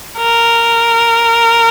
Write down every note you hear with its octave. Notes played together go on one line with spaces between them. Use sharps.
A#4